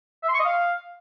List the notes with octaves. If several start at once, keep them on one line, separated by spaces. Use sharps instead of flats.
E5
C6
C#6
D#5
F5